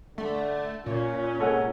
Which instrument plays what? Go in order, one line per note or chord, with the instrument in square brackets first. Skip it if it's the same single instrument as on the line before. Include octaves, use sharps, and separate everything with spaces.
[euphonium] D3 [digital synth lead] A3
[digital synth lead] A#2 [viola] C#4 [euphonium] F4
[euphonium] G#3 [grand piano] A4 C#5 F#5